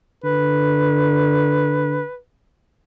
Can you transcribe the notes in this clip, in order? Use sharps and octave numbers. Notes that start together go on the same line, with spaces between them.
D3 B4